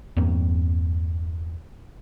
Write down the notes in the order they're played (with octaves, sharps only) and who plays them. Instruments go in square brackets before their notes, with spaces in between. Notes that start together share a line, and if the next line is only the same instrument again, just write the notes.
[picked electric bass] E2 G2 A#3 C4